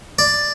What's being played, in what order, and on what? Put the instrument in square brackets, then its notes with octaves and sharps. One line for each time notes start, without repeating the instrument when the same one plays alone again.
[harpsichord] D5